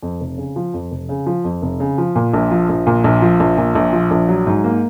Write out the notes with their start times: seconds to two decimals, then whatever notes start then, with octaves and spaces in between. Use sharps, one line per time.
0.03 F2
0.20 F1
0.38 C#3
0.56 F3
0.74 F2
0.91 F1
1.09 C#3
1.26 F3
1.44 F2
1.62 F1
1.80 C#3
1.98 F3
2.16 A#2
2.34 A#1
2.51 F3
2.69 A#1
2.87 A#2
3.04 A#1
3.22 F3
3.40 A#1
3.57 A#2
3.75 A#1
3.93 F3
4.11 A#1
4.28 F#3
4.47 G#2
4.64 A#3